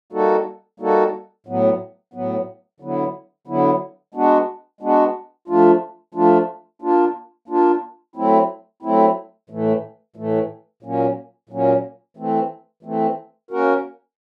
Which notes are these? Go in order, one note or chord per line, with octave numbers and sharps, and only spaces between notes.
G3 A#3 D#4 F#4 A4
G3 A#3 D#4 F#4 A4
A2 F#3 B3
A2 F#3 B3
D3 F#3 B3 E4
D3 F#3 B3 E4
G#3 B3 D4 F#4
G#3 B3 D4 F#4
F3 A3 D4 F4
F3 A3 D4 F4
A#3 D4 F4
A#3 D4 F4
F#3 A3 C4 E4
F#3 A3 C4 E4
A2 E3 A3
A2 E3 A3
A#2 F#3 A#3 C#4
A#2 F#3 A#3 C#4
E3 A3 C4
E3 A3 C4
A#3 C#4 F#4 A#4